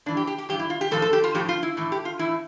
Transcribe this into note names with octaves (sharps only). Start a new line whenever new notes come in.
G2 E3 D4
G4
G4
G4
G2 E3 G4
E4
F4
G4
A2 F3 A4
A4
G4
F4
A2 F3 G4
F4
E4
A2 E3 E4
G4
F4
A2 E3 E4